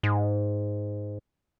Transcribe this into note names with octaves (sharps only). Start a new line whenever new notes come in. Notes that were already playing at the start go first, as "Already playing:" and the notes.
G#2